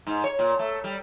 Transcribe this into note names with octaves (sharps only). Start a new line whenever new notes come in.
G#2
C#5
A#2
A3
G3